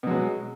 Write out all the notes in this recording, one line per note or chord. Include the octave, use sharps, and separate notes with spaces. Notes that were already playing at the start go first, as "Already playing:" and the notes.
B2 F#3 G#3